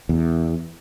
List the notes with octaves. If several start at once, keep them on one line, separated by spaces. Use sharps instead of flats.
E2